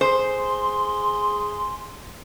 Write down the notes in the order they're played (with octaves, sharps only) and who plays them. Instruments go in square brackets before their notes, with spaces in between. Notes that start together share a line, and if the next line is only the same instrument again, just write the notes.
[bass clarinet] G#4 [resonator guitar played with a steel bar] C5 [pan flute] C6